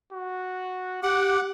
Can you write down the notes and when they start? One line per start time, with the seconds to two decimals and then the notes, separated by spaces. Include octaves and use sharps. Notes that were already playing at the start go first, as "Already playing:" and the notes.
0.13 F#4
1.03 G4 F#5 D6